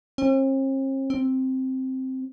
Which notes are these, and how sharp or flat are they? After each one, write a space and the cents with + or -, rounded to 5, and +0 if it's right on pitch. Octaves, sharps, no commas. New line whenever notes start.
C4 +45
C4 +0